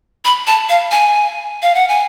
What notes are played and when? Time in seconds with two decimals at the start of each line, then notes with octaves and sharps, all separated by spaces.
0.25 B5
0.47 A5
0.69 F5
0.91 G#5
1.62 F5
1.75 F#5
1.89 G#5